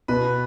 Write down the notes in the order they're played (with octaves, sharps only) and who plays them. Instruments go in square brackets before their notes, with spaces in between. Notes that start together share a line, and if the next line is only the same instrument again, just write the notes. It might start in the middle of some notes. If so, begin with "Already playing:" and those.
[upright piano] B2 [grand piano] B4